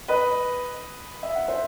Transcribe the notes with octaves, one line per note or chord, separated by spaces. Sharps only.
B4 D#5
E5
F#5
C5 E5